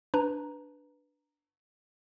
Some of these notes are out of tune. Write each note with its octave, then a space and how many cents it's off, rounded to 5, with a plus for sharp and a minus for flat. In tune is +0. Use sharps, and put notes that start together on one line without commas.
D4 +0 B4 +0 A#5 +0